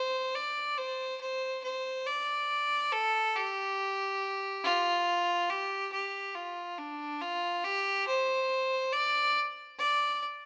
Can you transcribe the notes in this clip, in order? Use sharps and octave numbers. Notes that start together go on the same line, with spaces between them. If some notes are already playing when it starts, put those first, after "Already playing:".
Already playing: C5
D5
C5
C5
C5
D5
A4
G4
F4
G4
G4
F4
D4
F4
G4
C5
D5
D5